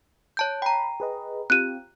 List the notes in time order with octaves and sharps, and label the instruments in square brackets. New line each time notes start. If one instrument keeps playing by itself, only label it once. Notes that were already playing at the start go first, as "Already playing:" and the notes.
[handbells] C#5 A5 G6
[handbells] G5 A#5 [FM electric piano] B5
[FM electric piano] G#4 B4 D#5
[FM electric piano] C4 F4 G4 [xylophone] F#6 D#7